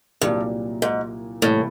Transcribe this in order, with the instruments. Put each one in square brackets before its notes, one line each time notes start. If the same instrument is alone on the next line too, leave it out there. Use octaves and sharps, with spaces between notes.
[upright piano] C2 A#2 F#3 A#3 [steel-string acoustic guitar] G2
[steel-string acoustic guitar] G#2
[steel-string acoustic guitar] A2 [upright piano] C3 E3 G3 A#3